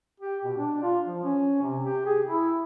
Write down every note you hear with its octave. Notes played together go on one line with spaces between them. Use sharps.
G4
B2
D4
F4
F3
C#4
C3
G4
G#4
E4